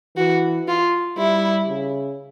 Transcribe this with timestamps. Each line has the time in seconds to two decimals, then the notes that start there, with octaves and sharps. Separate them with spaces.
0.16 E3 F#4
0.68 F4
1.17 G3 E4
1.68 C#3